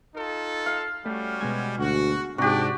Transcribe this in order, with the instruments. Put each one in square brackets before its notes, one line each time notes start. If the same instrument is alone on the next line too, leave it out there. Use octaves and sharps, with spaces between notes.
[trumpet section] D#4 F4 A4
[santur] F5
[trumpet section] G3 C#4 F#4 [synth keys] A3
[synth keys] B2 G#3 G#5
[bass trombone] D2 [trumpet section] F#4
[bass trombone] G#2 [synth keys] C3 [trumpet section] D4 [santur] F#4 G4